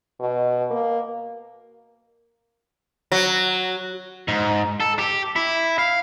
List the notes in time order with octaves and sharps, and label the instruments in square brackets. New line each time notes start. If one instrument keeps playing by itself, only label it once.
[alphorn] B2
A#3
[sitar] F#3
[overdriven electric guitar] G#2
A4
G4
E4
F5